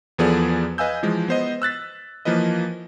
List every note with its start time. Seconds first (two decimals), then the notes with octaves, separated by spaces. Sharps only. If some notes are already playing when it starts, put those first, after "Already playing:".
0.18 E2 F3 B3 G#4 A4 D5
0.78 B4 D#5 F5 G#5 E6 G6
1.03 E3 F3 G#3
1.28 B3 C5 D#5
1.62 E6 F#6 A6 B6
2.25 E3 F3 A#3 B4 D#5